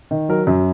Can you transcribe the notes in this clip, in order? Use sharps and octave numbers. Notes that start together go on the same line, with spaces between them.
D#3
F#3 A#4
F#2